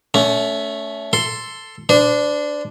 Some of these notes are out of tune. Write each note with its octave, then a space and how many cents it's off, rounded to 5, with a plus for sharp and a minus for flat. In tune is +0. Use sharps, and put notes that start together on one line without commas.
A3 +0 C#4 +30
A4 +5 C6 +0
D4 +0 C5 -35